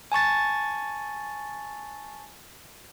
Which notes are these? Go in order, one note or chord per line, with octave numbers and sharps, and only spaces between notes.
G#5 A5 C#6 A6